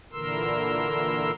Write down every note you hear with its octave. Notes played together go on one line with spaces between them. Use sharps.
A#2 D3 E3 A#4 C6 E6